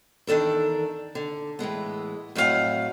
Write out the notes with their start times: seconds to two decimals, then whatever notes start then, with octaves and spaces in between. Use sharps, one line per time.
0.27 E2 D#3 D4 A4 A#4
1.15 D3
1.59 A2 E3 G#3 B3
2.35 F2 A2 F#3 E4 F5 F#5